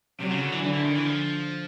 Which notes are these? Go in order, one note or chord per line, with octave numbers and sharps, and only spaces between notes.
C3 F#3
C#3
D3
E3
D3 E3
E3
D#3
E3
F3